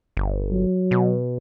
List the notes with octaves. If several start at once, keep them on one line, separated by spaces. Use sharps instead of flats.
G1
F#3
B2